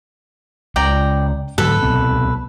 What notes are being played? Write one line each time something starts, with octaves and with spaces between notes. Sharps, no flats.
C#2 C#3 D5 G5 A#5
G#2 D3 F#3 A4 B4
C2 B2 C4